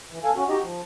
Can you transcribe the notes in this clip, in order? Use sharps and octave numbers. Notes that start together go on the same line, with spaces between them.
E3
E2 A4 F5 G#5
C#4 F#4
D#4 F#4 G4 D#5
F3